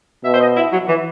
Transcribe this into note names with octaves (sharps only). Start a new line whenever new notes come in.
B2 E5
C5
D#5
E4
F#3
E3